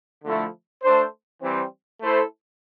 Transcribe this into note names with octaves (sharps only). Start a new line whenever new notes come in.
D3 F3 A3 E4
A3 D4 A4 C5
E3 G3 C4
A3 E4 A4 C5